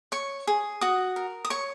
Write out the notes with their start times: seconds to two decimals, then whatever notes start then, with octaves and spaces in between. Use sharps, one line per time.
0.12 C#5 C#6
0.47 G#4
0.81 F#4 D#6
1.16 A#4
1.45 D#6
1.50 C#5 C#6